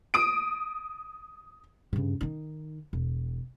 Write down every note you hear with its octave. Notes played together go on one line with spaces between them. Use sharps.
D#6 D7
G2 C#3
D#3 D#4
E1